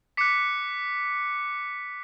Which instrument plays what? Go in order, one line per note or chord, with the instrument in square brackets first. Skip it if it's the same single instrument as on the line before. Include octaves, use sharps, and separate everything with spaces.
[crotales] D6 F#6 B6 C#7